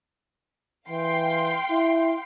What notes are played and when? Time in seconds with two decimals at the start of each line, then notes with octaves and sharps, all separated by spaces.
0.89 E3 F5 G5 C6
1.71 E4